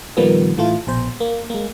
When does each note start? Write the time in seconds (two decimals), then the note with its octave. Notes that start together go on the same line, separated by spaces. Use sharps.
0.17 A#2 D#3 F3 G3 A#3 B3
0.57 A2 E3 A3 F4
0.87 A#1 B2 C5
1.20 A#3
1.50 G#3 A#3